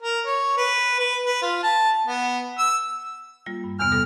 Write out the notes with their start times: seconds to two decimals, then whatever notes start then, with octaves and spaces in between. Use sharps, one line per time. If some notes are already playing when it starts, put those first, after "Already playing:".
0.02 A#4
0.26 C#5
0.57 B4
1.00 B4
1.26 B4
1.42 F4
1.63 A5
2.07 B3
2.59 E6
3.46 G3 A#3 F4
3.64 G2
3.79 E2 C3 B3 F6
3.92 B2 G3 A4